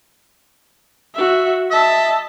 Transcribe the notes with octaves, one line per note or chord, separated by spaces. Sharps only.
F#4 E5
D#5 E5 A5